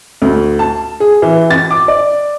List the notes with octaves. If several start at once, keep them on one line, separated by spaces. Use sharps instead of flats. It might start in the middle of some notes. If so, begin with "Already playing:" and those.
D2
A5
G#4
E3
A6
D6
D5